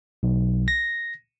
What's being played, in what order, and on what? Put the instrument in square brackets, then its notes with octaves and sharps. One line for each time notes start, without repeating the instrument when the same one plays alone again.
[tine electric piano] B1
A#6